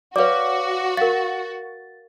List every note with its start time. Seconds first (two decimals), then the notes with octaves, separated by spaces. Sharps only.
0.16 F#4 B4 C#5 D5 F5 D6
0.97 A#4 F5 A6